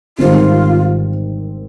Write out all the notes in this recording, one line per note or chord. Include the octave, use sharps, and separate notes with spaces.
G#1 G#2 D#3 G3 C4 F4